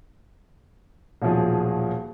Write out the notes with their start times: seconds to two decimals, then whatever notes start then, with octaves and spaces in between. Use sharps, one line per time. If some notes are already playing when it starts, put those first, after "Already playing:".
1.22 D#1 B1 F3 G#4